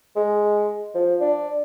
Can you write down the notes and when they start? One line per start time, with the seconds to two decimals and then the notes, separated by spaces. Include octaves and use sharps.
0.16 G#3
0.95 F3
1.21 D4